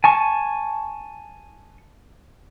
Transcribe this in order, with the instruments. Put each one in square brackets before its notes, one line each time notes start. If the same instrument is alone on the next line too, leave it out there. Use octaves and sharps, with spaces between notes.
[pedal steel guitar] G#5 A5 C#6